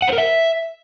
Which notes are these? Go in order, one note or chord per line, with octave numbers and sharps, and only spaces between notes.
F#5
C5
A#4
E5